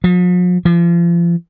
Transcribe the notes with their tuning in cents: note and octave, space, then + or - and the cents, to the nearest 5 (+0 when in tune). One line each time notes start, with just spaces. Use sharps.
F3 +45
F3 -35